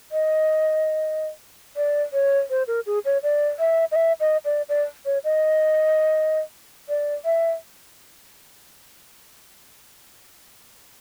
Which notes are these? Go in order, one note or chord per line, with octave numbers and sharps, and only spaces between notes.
D#5
D5
C#5
C5
A#4
G#4
C#5
D5
E5
D#5
E5
D#5
D5
D5
C#5
D#5
D5
E5